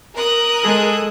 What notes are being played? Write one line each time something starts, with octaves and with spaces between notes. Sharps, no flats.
A#4 D#6 F#6
G#3 G#4 A4